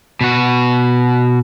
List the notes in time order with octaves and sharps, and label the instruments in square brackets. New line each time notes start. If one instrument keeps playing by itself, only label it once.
[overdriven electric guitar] B2 F#4